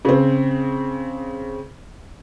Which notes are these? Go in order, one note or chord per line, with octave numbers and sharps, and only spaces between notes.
C#3 C4